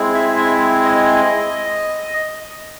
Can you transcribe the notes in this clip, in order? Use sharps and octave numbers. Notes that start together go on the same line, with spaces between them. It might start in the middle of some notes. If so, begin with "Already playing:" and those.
Already playing: G#3 C4 E4 G#4
E5
E5
D#5